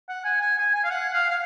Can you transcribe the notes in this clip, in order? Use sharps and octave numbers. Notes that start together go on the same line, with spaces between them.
F#5
G#5
G#5
G#5
G#5
F5
F#5
F5
F5